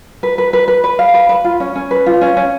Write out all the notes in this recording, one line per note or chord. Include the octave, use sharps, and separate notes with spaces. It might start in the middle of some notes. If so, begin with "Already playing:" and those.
B4
B4
B4
B4
B4
F5
B4
B4
F4
C#4
C#4
B4
F4
C#4
C#4